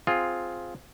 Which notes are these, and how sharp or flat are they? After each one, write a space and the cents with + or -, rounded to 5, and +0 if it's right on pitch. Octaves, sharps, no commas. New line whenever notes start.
C4 -5 F4 +5 G#4 +10